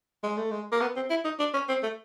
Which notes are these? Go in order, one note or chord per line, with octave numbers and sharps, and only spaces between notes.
G#3
A3
G#3
A#3
B3
C4
E4
D#4
D4
C#4
C4
A3